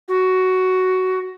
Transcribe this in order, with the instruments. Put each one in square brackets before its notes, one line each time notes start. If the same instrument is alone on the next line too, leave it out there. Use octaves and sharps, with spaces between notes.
[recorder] F#4